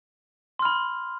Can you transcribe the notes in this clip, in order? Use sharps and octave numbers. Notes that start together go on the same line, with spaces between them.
B5 C6 F6